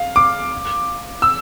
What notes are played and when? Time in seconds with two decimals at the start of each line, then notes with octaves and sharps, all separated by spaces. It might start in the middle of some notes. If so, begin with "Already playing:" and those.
Already playing: F5
0.16 D6
1.22 E6